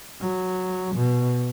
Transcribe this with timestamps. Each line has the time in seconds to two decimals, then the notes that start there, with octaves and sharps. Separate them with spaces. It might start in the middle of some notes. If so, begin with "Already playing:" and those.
0.21 F#3
0.95 B2